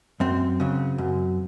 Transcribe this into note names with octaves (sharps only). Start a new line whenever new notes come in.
F#2 C4
C#3 F#3
F#2